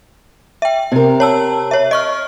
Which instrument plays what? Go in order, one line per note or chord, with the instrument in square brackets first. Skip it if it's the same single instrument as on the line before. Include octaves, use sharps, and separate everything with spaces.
[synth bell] E5 G5
[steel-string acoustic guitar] C3 A#4
[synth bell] C#5 A5 E6
C#5 E5
D#5 C#6 F6